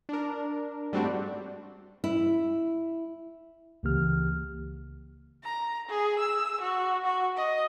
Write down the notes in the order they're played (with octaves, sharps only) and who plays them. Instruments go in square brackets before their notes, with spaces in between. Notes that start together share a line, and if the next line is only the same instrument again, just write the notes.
[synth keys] D4 A#4
G#2 G3 A3 C4 D4 F#4
[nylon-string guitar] E4
[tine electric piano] C#2 C#3 E3 A#3 G4 F6
[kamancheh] A#5
G#4
E6
F#4
F#4
D#5